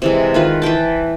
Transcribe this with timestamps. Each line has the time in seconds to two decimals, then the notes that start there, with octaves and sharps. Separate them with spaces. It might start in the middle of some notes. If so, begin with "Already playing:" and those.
0.02 C3 E3 G#3
0.34 D#3 F4 B4
0.62 E3 B4 G5 A5